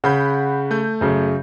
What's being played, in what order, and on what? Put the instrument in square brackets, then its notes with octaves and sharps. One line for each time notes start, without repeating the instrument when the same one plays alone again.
[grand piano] C#3 [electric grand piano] F#5 B5 G6
[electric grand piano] A3 G6
[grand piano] F#2 C#3